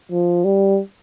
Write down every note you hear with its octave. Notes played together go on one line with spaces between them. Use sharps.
F3
G3